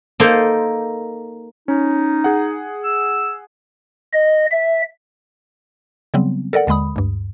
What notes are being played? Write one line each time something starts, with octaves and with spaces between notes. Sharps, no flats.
A#3 D#4 A4 C5
C#4 D#4
G#4 F#5
E6
D#5
E5
C#3 F#3 G3 B3 C4
A4 A#4 D5 F#5
D#2 D3 G#3 B5 D#6
D2 G2